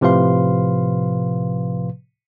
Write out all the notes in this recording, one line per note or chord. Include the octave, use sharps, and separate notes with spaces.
A2 C3 F3 B4 F5 C6